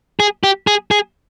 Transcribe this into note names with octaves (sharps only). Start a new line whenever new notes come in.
G#4
G4
G#4
G#4